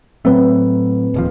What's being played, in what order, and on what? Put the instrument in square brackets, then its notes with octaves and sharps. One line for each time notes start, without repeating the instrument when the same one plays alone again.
[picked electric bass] A2 F#3 A3 [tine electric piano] C4 B4
[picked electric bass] D1 D#2 F3